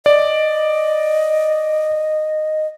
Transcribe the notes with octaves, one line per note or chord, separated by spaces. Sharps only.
D5 D#5